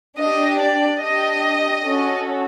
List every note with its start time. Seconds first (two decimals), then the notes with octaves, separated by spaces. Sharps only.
0.17 D4 G4 D#5
0.59 D5
1.01 D4 G4 D#5
1.85 C#4 F#4 A4